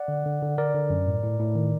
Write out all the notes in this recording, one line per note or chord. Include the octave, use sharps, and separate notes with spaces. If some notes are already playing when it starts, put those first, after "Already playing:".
Already playing: D5 F#5
D3
D3
D3
D3 A#4 D5
D3
F#2
A2
A2
A2
D#3